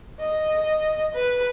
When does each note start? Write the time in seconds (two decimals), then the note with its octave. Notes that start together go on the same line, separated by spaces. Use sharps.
0.20 D#5
1.15 B4